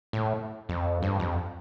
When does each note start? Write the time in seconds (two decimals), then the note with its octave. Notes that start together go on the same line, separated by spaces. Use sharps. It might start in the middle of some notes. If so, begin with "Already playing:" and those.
0.13 A2
0.69 F2
1.03 G2
1.20 F2